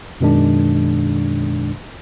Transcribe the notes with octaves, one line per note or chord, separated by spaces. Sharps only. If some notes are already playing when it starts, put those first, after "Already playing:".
F#2 B2 D#3 G#3 D4